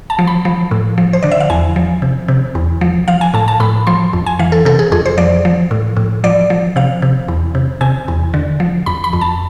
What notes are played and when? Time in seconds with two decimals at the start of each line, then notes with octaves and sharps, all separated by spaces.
0.10 A5
0.19 F3
0.27 B5
0.45 F3
0.71 A2
0.98 F3
1.13 C5
1.23 D3 D5
1.32 E5
1.40 F5
1.50 E2 G#5
1.76 F3
2.02 C3
2.28 C3
2.55 E2
2.81 F3
3.08 F3 F5
3.21 G#5
3.34 A2 A5
3.48 A5
3.60 A2 B5
3.87 F3 C6
4.13 F2
4.26 G#5
4.39 E3 F5
4.52 A4
4.65 C3 A4
4.79 G#4
4.92 F2 G#4
5.06 C5
5.18 F3 D5
5.45 F3
5.71 A2
5.97 A2
6.24 F3 D5
6.50 F3
6.76 C3 F5
7.02 C3
7.28 E2
7.55 C3
7.81 C3 G#5
8.08 E2
8.34 D3
8.60 F3
8.86 F2 B5
9.04 B5
9.13 F2
9.21 A5